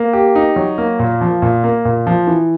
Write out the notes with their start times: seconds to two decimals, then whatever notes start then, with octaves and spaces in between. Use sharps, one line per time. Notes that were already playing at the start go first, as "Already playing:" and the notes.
Already playing: A#3
0.13 G4
0.35 D#4
0.56 F#3
0.78 A#3
0.99 A#2
1.21 F3
1.42 A#2
1.64 A#3
1.85 A#2
2.07 F3
2.27 E3